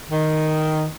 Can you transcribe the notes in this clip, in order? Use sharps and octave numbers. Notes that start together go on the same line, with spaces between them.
D#3